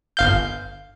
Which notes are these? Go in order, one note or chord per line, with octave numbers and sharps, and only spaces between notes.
G1 F5 G6